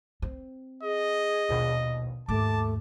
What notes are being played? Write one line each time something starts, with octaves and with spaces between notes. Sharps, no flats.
C4
G#4 D#5
A#1 D#2 B2
D#2 G#2 A3 A5 D6